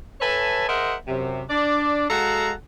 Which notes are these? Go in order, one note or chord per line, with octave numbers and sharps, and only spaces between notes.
A4 B4 C#5 E5 G#5 A5
G#4 A#4 C5 D#5 E5 F#5
F#2 C3
D4 D5
G#3 F#4 A4 F5 F#5 A#5